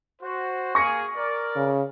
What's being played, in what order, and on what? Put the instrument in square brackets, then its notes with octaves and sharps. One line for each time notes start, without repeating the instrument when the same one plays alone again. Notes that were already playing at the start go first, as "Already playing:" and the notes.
[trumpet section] F#4 C5
[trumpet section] A#3 G#4 [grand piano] C#6 A#6 C#7
[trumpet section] A#4 D5
[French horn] C#3